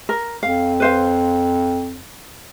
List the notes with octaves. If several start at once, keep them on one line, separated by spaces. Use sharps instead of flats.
A#4
F2 F5
B4 C5 F5